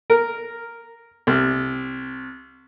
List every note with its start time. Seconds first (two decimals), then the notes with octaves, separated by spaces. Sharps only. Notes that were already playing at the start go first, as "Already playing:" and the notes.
0.10 A#4
1.27 C2